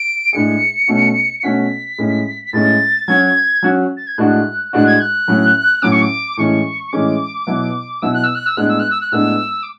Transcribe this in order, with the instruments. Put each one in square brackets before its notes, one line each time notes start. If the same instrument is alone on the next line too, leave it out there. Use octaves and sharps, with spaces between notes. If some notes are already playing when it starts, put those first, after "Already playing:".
Already playing: [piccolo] D7
[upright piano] A2 G#3 D4 G#4 [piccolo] C#7
[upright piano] B2 A3 C#4 F#4
[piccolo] C#7
[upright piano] B2 A3 C#4 F#4 [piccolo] B6
[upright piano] A2 G#3 C#4
[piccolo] B6
[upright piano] A2 G#3 C#4 [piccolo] A6
[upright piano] F#3 C#4 F#4 [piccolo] G#6
[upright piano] F#3 C#4 F#4
[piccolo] A6
G#6
[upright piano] A2 G#3 D4 F#4 [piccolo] F#6
[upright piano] A2 G#3 D4 F#4 [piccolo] F#6
[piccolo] G#6
F#6
[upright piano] A2 F#3 C#4
[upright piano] A2 F#3 C#4 [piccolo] D6
[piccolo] C#6
D6
[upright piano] A2 E3 G#3 C#4 [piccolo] C#6
[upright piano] A2 E3 G#3 C#4 [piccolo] D6
[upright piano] B2 F#3 B3 E4
[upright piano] B2 F#3 B3 E4 [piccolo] E6
[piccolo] F#6
E6
F#6
E6
[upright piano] A2 G#3 B3 D4 [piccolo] F#6
[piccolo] E6
F#6
E6
F#6
[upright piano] A2 G#3 B3 D4 [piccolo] E6
[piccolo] D6